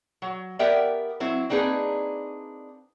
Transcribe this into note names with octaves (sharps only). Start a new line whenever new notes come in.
F#3
B3 G4 A#4 D5 E5 G5
F#3 C4 E4
A#3 C4 D4 D#4 G#4 B4